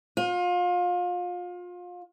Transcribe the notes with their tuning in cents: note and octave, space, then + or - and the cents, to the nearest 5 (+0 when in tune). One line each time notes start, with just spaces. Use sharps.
F4 +30